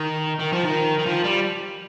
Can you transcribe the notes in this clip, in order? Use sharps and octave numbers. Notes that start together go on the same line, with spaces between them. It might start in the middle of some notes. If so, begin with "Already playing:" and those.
Already playing: D#3
D#3
F3
D#3
D#3
F3
G3